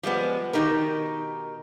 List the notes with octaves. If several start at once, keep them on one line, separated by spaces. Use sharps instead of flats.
F3 G3 G#3 B3
B2 D#3 B3 D#4 G4 A#4